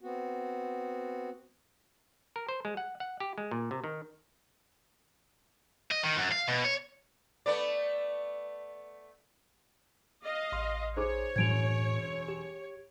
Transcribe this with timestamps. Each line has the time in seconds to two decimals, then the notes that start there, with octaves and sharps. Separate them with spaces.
0.01 B3 C4 F#4
2.36 A#4
2.49 C5
2.65 G#3
2.77 F#5
3.00 F#5
3.20 G4
3.38 G#3
3.51 A#2
3.71 C3
3.84 D#3
5.91 D#5
6.03 D#3
6.16 F#2
6.31 F5
6.48 B2
6.64 C#5
7.46 A3 B3 D5
10.24 D#5 F5
10.52 A1 C6
10.97 D#4 G#4 C5 C#5 D6
11.36 E1 F#2 A2 G#6 D7 F7
12.29 G4